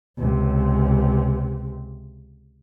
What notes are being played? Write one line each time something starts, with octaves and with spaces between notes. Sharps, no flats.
C#2 C3